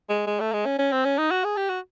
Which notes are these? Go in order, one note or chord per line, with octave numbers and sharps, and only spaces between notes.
G#3
G#3
A3
G#3
C#4
C#4
C4
C#4
D#4
F#4
G#4
G4
F#4